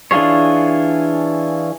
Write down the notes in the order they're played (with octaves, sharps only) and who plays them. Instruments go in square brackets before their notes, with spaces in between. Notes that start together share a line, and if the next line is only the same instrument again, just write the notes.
[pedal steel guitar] E3 D4 F4 G#4 C#5